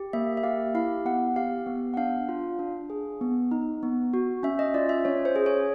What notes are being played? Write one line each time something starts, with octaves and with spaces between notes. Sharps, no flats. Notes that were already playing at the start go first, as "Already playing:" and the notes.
Already playing: G4
A#3 E5
E5
G4 F5
E4 F5
B3 F#5
G4 F5
B3
F#5
D4 F5
F4
D4
G#4
B3
D#4
B3
F#4
C#4 E5
D#5
F4 D5
E5
C#4 C#5
C5
G#4
C#5